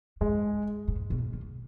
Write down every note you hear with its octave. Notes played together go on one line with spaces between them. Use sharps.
G#2 G#3
G#2
B2
D#3